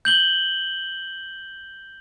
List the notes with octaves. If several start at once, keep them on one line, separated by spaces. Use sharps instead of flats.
G6 F#7 G7